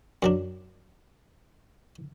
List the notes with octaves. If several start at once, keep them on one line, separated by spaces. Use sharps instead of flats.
F#2 F#3 D4